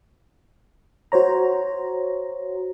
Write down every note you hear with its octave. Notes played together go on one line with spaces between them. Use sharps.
F#4 C5 C#5 A#5